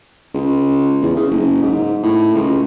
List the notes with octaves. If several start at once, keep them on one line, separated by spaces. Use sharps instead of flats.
C#2
E2
C#3
F#1
G#2
A2
C#2